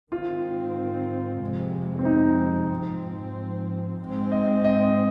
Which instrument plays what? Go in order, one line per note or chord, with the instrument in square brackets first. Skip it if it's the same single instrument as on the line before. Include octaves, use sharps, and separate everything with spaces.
[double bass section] G#2 D#3 C4 [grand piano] F4
[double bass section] F2 C3 G#3
[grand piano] C4
D#4
[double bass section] G#2 F3 C4
G#2 G#3 C4
[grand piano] D#5
D#5